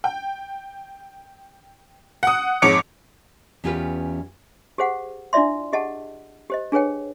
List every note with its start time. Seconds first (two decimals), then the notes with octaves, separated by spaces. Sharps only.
0.04 G5
2.23 F#5 D#6
2.62 F2 G#2 C#5 D6 C#7 D7
3.64 E2 C#4 F4 G4 B4
4.78 G4 G#4 C5 F5 F#5
5.33 D4 E4 F4 D5 E5 C6
5.73 G4 G#4 D#5 F#5 A5
6.50 G4 C5 D#5
6.72 D4 G#4 B4 C#5 G5